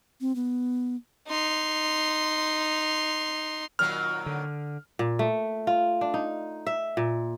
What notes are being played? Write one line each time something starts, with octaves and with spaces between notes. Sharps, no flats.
C4
B3
D#4 C6
A#2 D#3 F#3 F6
D3
A#2
A3
F4
D4
D#4
E5
A#2